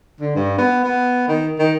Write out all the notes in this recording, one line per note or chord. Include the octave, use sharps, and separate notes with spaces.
D3
G2
B3
B3
D#3
D#3